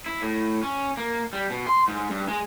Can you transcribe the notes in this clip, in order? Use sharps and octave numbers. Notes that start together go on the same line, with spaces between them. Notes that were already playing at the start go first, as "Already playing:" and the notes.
E4
A2
C#4
A#3
G3
B2
C6
G#2
G2
G#3